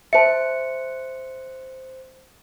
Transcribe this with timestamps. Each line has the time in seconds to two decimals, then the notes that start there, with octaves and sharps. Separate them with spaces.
0.13 C5 E5 A5 C#7